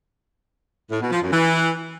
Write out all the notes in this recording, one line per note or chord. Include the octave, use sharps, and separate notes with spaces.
A2
B2
F3
F#2
E3